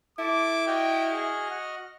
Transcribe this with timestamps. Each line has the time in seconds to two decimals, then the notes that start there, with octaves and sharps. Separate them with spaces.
0.19 E4 A4 A5 D6
0.67 F#4 D#5 G5 F6
1.12 G#4
1.50 F#5